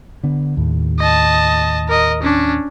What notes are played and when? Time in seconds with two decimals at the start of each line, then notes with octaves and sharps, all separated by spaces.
0.24 D3 B3
0.57 D#2 A2
1.00 D#5 A5
1.88 A#4 D#5
2.23 C#4 D4